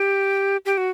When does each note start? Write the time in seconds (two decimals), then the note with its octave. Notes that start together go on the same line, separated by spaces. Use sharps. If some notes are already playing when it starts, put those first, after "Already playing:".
Already playing: G4
0.65 G4
0.78 F#4